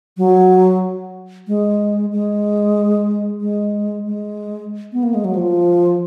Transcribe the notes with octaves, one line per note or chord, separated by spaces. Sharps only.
F#3
G#3
G#3
G#3
G#3
B3
A#3
G#3
F#3
F3